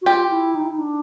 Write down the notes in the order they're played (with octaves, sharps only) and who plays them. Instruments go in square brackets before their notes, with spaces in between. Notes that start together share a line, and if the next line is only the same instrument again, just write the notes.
[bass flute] F#4
[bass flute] F4 [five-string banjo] G4
[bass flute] E4
D#4
E4
D#4
D4